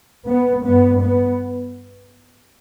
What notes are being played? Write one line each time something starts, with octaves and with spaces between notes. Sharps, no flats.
B3
G2 B3
B3